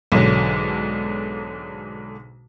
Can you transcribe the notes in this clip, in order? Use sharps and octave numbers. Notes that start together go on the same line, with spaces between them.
B1 G#2 D3 F#3